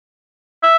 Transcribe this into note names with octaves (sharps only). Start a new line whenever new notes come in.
E5